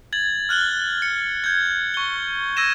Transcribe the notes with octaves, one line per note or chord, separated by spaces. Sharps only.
G#6 A6 F#7
F6 F#6 F#7 G7
C#7
G6 G#6
C#6 G7
E6 G#6 A#6 D#7 E7